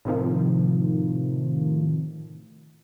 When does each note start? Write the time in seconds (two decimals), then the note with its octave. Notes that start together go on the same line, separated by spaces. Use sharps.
0.05 A2 C3 D#3 F3